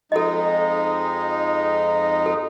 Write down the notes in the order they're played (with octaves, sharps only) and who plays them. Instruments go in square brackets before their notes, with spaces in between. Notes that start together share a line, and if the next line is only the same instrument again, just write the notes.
[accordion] F2 G#3 D#4 [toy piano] A4 D#5
[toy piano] A4